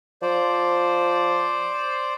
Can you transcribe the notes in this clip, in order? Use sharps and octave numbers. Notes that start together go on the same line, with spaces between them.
F3 C5 D5